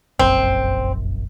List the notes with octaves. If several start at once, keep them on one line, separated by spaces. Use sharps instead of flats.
F1 A#1 F#2 C4